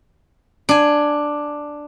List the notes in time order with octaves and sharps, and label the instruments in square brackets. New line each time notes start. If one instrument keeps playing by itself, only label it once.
[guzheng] D4 G#5